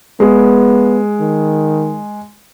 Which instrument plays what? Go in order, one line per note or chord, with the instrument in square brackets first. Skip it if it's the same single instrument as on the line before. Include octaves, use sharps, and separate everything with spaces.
[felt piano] G#3 [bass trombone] B3
[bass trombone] D#3